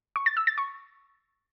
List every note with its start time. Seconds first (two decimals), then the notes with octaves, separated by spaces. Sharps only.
0.16 C#6
0.26 A6
0.37 E6
0.47 A6
0.58 C#6